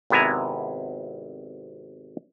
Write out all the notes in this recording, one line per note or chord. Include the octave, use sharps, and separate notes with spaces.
G#1 C3 B3 E4 G#5 A#5